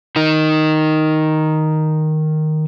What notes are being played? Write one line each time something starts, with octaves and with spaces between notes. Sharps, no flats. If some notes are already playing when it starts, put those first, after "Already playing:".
D#3 D#4